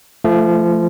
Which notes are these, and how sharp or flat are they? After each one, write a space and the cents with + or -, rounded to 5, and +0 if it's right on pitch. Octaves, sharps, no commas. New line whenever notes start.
F3 -25 A3 +0